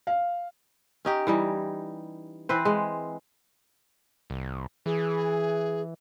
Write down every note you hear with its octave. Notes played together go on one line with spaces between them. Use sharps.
F5
C#4 D#4 G4
E3 G3 D#4
E3 C4 B4 C5
G#3
C2
E3 G#4